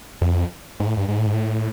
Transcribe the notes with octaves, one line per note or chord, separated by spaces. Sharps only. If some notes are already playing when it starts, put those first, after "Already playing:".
F2
G#2
A2
G2
G#2
A2
G#2
A2